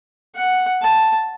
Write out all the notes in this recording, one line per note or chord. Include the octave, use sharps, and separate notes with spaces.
F#5
A5